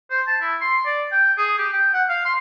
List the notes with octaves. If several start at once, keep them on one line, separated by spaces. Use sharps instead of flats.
C5
A5
E4
C6
D5
G5
G#4
G4
G5
F#5
F5
C6